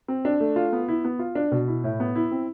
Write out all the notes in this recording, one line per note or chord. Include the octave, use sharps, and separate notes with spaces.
C4
D4
A3
F4
B3
E4
B3
F4
D4
B2
E4
A2
B3
E4
C4